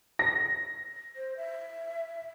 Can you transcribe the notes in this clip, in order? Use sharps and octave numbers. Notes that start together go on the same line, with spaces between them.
A#6
C5
E5